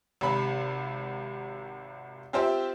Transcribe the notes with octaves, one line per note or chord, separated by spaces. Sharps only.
G#1 C3 B5
C4 F4 G4 C5 E5